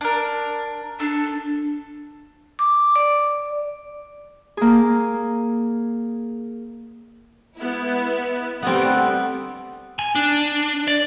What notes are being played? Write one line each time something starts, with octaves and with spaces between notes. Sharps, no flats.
D4 A#4
D4 A4
D6
D5
A#3 G#4
G#3 B3 E4
D3 G3 A3 B3 C4
G#5
D4
D5